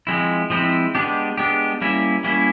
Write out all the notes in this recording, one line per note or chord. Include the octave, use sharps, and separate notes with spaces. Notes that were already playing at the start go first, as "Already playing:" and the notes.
F3 G#3 C4 E4
F3 G#3 C4 E4
G#3 B3 D4 G4
G#3 B3 D4 G4
G3 A#3 C#4 E4
G3 A#3 C#4 E4